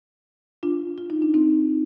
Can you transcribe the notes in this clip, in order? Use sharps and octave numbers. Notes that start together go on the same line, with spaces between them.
D4 F4
F4
D#4
D4
C4 D#4